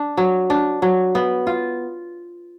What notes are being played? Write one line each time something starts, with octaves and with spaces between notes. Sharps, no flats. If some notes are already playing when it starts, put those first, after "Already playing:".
Already playing: D4
F#3
D4
F#3
B3
F4